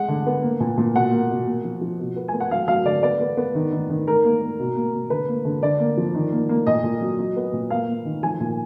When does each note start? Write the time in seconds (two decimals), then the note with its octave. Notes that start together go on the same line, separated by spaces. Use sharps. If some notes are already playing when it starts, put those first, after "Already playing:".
Already playing: G#3 F#5
0.08 D3
0.27 B3
0.43 A#3
0.60 A#2
0.77 A#2
0.95 B2 F#5
1.12 A#3
1.30 B2
1.47 A#3
1.64 F3
1.81 F3
2.00 B2
2.16 B3
2.28 B3 G#5
2.40 F#5
2.51 F#3 F5
2.68 F#3 F5
2.85 D3 D5
3.03 B3 D5
3.21 B3
3.37 B3
3.55 D#3
3.72 D#3
3.90 D#3
4.07 D#3 A#4
4.25 A#3
4.41 A#3
4.59 B2
4.76 A#3
4.94 B2
5.10 D3 B4
5.28 A#3
5.45 D3
5.63 D3 D5
5.80 A#3
5.97 F3
6.15 D#3
6.32 A#3
6.49 A#3
6.67 A#2 D#5
6.84 A#2
7.01 F#3
7.19 F#3
7.36 B3
7.53 A#2
7.70 A#3 F5
7.88 A#3
8.05 D#3
8.23 F3 G#5
8.40 A#2